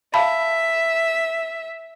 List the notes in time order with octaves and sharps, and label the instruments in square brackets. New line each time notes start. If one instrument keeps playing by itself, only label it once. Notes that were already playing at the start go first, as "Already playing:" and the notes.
[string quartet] E5 [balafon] F5 A5 B5